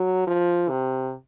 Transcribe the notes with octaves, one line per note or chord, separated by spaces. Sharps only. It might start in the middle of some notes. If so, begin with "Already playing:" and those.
Already playing: F#3
F3
C3